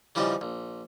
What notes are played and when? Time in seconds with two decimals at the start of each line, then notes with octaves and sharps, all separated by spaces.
0.15 C#3 E3 F3 G3 D#4
0.41 A#1